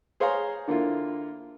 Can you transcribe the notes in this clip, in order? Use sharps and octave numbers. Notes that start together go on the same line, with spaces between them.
G#4 C5 C#5 F5 G#5 A#5
D3 A#3 E4 F4